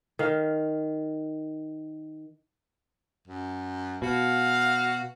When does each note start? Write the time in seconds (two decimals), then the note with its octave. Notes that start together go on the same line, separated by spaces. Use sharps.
0.19 D#3 F5
3.28 F#2
4.02 B2 F#4 F5